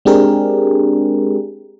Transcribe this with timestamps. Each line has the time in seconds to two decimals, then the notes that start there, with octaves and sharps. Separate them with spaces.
0.05 G#3 C4 D4 G4 G#4 A#4